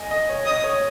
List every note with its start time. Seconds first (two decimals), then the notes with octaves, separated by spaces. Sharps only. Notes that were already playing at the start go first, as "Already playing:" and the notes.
Already playing: D#5 G#5
0.11 D#5
0.29 C#5
0.45 D#5 D#6
0.64 C#5